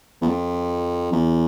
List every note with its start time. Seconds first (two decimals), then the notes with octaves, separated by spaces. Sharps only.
0.21 E2
0.27 F2
1.13 E2